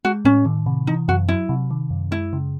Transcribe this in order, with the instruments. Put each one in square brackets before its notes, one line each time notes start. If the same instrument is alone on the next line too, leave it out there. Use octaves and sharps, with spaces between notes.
[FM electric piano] G#3 [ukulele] F#4
[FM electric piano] A2 [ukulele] C#4
[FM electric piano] D#3
C3
[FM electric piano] E3 [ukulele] D#4
[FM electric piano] F#2 [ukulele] F#4
[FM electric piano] F#3 [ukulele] E4
[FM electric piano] C3
D#3
F#2
[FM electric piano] G#3 [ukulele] E4
[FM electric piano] C#3